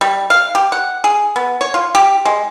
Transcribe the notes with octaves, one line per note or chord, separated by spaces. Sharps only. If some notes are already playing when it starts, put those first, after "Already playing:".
G3
F5
G4
F#5
G#4
B3
C#5
F4
G4
G#3